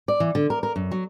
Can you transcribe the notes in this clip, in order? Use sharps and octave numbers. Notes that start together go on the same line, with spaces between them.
D5
E3
D3
A#4
A#4
F#2
F#3